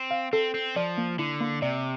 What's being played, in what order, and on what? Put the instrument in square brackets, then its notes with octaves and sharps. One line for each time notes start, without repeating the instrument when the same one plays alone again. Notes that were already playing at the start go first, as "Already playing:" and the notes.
Already playing: [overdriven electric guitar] C4
[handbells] F5
[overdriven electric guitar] C4 [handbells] A4
[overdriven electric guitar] C4 [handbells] A4
[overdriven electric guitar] F3 [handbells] D5
[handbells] A#3
[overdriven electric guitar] D3 [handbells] E4
[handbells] A#3
[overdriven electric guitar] C3 [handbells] D5